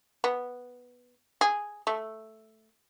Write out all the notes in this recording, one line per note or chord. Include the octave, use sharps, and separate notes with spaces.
B3
G#4
A3